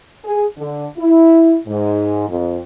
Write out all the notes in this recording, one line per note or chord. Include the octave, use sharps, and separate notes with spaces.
G#4
D3
E4
G#2
F2